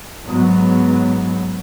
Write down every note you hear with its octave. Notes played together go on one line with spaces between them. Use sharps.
G#2 F#3 B3